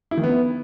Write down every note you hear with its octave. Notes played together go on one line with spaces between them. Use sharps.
E4
D#3
B3